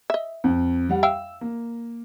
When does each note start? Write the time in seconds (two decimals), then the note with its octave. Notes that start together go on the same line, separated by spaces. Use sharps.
0.10 D#5 E5
0.44 F2
0.89 G3 F#5
1.03 E5 F5 G5 E6
1.41 A#3